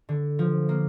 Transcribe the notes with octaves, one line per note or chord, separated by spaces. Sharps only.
D3
F3
A#3